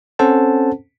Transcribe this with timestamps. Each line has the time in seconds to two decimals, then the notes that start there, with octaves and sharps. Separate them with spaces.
0.19 C4 C#4 A4 C5 F#5 A5